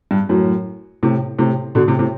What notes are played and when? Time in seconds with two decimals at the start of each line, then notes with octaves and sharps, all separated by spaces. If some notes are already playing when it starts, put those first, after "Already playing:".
0.11 G2
0.29 F#2 A2
1.03 A2 C3
1.39 A2 C3
1.75 B2 D3
1.88 A2 C3
1.99 A2 C3